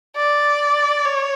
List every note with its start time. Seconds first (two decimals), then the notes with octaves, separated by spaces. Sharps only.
0.16 D5
1.05 C#5